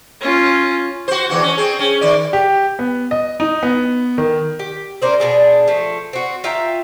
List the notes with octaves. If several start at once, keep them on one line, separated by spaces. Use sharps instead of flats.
C#4 F4
F#4 C5
E2 E3 F#4
C#4
C4 G#4
C#4
D#3 D5
G4
B3
D#5
D#4
B3
D#3
G4
C#4 A#4 C5 D5
B2 D4 G#4
F3 A3
C4 F#4
F4 E5 G5 A#5